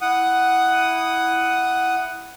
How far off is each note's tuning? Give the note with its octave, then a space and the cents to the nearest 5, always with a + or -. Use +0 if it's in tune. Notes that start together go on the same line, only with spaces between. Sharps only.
E4 +0 F#5 +5 D#6 -5